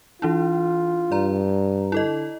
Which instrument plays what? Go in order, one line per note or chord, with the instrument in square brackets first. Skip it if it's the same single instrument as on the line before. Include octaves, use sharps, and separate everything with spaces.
[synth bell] E3 D4 E4 [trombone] F4
[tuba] G2 [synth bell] D5 A#5
[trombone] D3 [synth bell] E4 A4 D#5